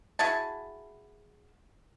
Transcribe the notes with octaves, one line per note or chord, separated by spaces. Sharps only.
E4 F#4 G#4 A5